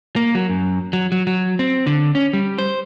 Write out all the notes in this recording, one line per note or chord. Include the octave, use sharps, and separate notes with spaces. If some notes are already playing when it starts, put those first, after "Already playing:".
A#3
F#3
F#2
F#3
F#3
F#3
C4
D3
C#4
G3
C5